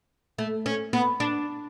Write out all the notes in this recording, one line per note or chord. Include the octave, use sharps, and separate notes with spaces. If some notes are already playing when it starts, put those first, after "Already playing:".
A3
C#4
B3
D4